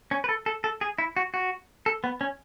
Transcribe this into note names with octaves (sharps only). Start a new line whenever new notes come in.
C#4
B4
A4
A4
A4
G#4
E4
F#4
F#4
A4
B3
C#4